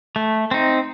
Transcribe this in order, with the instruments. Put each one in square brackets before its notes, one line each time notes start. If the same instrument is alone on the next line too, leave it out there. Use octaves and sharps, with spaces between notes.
[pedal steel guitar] A3
C4 D#4